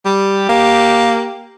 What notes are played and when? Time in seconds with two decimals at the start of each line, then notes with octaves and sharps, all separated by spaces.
0.05 G3 G4
0.49 A#3